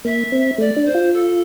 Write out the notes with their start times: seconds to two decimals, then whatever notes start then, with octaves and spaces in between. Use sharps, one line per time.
0.05 A#3 E5
0.32 C4
0.58 A3 D5
0.76 D4
0.85 C5
0.95 F4
1.13 A4